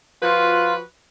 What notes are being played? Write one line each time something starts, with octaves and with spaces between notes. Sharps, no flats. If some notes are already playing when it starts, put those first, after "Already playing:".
F3 F4 F#4 B4